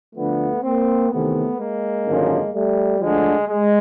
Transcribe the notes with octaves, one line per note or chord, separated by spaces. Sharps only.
D2 D3 F3 A3 B3
A#3 C4
E2 C3 D#3 A3 B3
G#3 A#3
G#1 F#2 D3 F3
G3 A3
D2 D3 F3 G#3
G#3